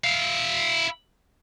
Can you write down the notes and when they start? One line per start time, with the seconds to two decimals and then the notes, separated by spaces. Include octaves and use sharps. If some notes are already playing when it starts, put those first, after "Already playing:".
0.04 E4 F5